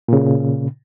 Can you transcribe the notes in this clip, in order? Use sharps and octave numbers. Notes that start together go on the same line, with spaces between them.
A#2 C#3